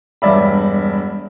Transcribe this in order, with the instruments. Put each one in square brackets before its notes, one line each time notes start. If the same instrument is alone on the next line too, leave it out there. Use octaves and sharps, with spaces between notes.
[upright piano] E1 G2 D5 E5 B5